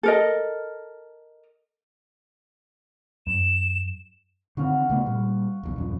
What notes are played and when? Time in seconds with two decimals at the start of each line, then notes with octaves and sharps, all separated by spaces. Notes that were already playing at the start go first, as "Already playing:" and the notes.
0.03 A4 A#4 D#5
3.27 F#2 E7
4.57 D3 D#3 C4 F#4 F5 F#5
4.90 C#3 A3 B3
5.06 A#2 G3
5.63 E1 B1
5.76 D#1 F#2 F3